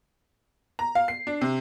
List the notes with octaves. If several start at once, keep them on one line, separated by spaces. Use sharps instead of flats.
A#5
F5
C7
D4
C3